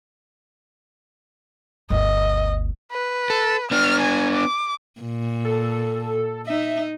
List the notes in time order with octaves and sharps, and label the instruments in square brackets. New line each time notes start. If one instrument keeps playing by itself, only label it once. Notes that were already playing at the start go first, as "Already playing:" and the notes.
[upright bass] G1 D2 [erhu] D#5
[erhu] B4
[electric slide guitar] A4
[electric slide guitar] B3 D4 [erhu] F6
[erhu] G#5
D6
[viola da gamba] A#2
[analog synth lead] A4
[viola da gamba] D#4 [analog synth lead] E5